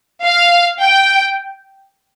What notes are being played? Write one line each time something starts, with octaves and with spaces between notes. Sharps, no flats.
F5
G5